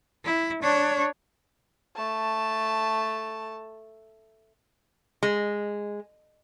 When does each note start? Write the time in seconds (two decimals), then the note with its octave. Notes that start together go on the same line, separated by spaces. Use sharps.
0.25 E4
0.62 D4 C#5
1.97 A3 A5
5.23 G#3